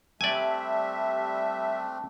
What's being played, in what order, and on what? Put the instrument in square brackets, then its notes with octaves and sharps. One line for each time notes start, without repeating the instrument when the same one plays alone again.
[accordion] G3 E5 [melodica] A3 C4 D4 [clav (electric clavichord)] D5 G#5